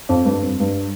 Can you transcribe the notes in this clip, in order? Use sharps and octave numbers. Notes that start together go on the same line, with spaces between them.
F2
G2
F2
G2